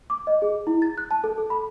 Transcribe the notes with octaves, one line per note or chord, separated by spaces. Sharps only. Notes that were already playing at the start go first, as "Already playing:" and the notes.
D6
D#5
G#4
E4
A6
F#6
A5
A4
A4
B5